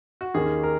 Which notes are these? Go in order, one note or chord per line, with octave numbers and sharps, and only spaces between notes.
F#4
D#2 D#3 A#3 C#4 G#4
A#4